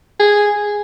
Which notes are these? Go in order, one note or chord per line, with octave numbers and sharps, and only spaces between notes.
G#4